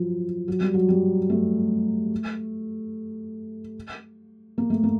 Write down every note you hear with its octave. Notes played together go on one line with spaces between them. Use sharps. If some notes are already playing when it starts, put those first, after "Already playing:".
Already playing: F3 F#3
F#3
G3
F#3
G3
A3
A#3
A3
A#3